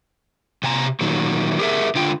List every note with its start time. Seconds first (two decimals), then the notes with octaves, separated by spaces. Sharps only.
0.63 C3 G#5 A#5
1.01 A#2 D#3 F#3
1.59 G4 G#4 A#4 E5
1.95 D3 F4 G5